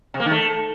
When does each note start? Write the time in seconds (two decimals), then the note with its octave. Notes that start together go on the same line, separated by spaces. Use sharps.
0.14 C3
0.20 A#3
0.26 D#3
0.31 A3